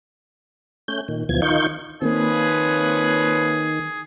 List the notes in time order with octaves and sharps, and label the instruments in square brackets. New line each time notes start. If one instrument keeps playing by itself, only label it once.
[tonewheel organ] A3 C#4 G6
A#2 D#3
D2 B2 E3 F3 G#6
D#3 D#4 F4 C#6 G6
[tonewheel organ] D#3 [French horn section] F3 B4 C#5 [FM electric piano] A#3 C4 [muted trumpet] G#4